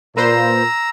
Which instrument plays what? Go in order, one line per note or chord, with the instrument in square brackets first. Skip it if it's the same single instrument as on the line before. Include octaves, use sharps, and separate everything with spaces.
[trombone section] A#2 [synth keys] A#3 B4 C5 [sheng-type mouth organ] A#5 E6